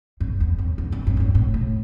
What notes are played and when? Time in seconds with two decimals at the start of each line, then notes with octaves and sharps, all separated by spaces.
0.20 F#2
0.40 E2
0.58 F#2
0.78 E2
0.92 F#2
1.07 F#2
1.17 F#2
1.20 G2
1.35 A2
1.54 A2